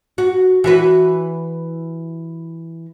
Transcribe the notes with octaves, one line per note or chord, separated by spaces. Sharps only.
F#4
E3 F#4 B4